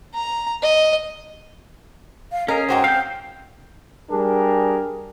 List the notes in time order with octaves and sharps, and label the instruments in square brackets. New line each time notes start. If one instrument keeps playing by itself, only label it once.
[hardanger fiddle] A#5
D#5
[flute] F5
[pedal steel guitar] C#4 G#4 [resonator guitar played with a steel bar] A#4 [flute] D#5
[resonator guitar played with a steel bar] G#2 F#4 C5 [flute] G5
[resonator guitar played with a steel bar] C4 [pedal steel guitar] F5 G6
[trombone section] G3 D4 G#4 A#4